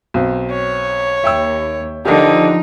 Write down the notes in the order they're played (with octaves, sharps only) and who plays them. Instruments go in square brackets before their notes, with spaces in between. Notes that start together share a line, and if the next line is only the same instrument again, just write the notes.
[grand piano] B1 C4
[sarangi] C#5
[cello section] D#2 [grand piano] E5 G5 E6
[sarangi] D3 [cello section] F3 D#4 [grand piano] G4 A#4 D#5